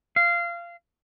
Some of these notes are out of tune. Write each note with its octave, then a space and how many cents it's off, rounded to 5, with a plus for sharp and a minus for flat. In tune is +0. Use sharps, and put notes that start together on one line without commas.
F5 -20